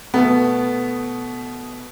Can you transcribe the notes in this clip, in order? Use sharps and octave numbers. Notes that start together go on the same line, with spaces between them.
B2 A3 B3